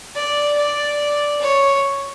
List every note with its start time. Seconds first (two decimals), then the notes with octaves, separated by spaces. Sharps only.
0.15 D5
0.57 D5
1.40 C#5